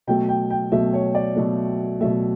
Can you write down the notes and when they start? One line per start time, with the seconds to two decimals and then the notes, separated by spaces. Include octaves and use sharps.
0.07 B2 F#3 A3 G5
0.29 G5
0.50 G5
0.72 B2 F#3 A3 E5
0.93 C#5
1.15 D5
1.36 B2 F#3 A3
2.01 B2 F#3 A3 E5